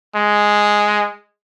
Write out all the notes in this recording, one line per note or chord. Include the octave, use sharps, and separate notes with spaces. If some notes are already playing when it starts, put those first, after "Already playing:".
G#3